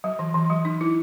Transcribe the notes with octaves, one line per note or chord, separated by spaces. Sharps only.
F#3
E3
E3
F#3
D#4
E4